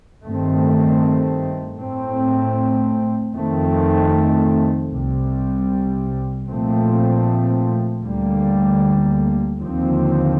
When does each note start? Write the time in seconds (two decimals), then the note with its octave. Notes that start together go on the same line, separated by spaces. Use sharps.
0.23 G2 D#3 A3 C4
1.79 A2 A3 C4
3.35 F2 D#3 A3 C4
4.91 C2 C3 G3
6.47 A#2 F3 A3 C4
8.03 D2 D3 G3 A#3
9.59 D#2 D3 F3 C4